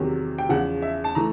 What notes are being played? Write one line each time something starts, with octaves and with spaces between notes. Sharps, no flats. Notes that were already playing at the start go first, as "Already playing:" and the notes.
Already playing: E2 C3 D#3 F#3
G5
E2 C#3 F3 F#5
E5
A5
E3 A3 A#5